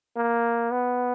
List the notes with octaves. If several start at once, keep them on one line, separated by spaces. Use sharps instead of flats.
A#3
B3